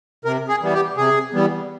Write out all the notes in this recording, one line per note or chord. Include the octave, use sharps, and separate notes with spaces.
C3 A#4
G#4
E3 G3 B3
G4
C3 G#4
E3 G3 B3